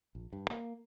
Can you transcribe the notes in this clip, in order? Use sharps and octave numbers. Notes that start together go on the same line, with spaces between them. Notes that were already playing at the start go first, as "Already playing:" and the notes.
A#1
G2
A#3